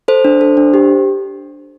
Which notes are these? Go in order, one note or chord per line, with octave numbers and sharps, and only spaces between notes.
A4 C5
D4
A4
D4
G4